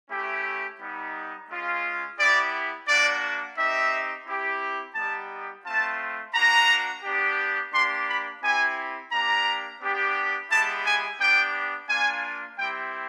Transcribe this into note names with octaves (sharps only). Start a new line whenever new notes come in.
A3 C#4 E4 G4
G3 B3 D#4
G#3 C#4 F4
B3 E4 G4 D5
A#3 D4 F#4 D5
C4 D#4 G4 E5
C4 E4 G4
G3 B3 D#4 G4 A5
A3 C4 F4 A5
A#3 D4 F#4 A#5
B3 D4 G4
A#3 D4 G4 C6
B5
C4 E4 G4 G#5
A#3 D4 G4 A#5
B3 D4 G4
G#3 B3 E4 G4 A5
G#5
B3 D4 G4 G5
A#3 D4 F4 G#5
G3 C4 E4 G4 G5